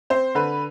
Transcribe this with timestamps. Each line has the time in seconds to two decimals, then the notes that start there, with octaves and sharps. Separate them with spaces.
0.10 C4 C5
0.35 D3 B4